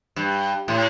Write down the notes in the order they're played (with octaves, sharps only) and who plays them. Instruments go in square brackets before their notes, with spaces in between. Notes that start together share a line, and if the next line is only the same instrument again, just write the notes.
[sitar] G2
A2